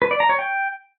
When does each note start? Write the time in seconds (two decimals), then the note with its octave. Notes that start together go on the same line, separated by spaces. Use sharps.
0.02 B4
0.11 D5
0.20 A#5
0.29 C#5
0.39 G5